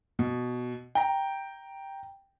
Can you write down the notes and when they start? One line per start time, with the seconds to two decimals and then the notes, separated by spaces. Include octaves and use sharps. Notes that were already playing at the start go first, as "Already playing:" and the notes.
0.19 B2
0.95 G5 A#5